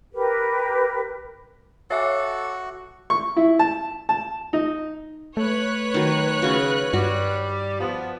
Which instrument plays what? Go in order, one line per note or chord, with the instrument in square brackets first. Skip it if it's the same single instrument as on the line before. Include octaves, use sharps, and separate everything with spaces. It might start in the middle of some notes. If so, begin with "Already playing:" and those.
[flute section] G4 A#4 B4
[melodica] F#4 F#5 [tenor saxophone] A4 [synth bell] C#5 E5 D6
[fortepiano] C#6
E4
A5
A5
D#4
[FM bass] A3 [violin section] B4 C#5 F#6
[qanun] D#3 F#3
[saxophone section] C#3 [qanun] F#4 C#6
[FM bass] G2 [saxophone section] G3 [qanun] F#4
[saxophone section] F3 B3